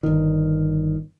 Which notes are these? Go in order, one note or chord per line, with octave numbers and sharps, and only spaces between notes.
G1 D#3